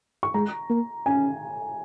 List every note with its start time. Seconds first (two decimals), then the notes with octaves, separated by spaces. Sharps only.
0.23 C#6
0.34 G#3 A#5
0.70 A#3
1.06 C#4 G#5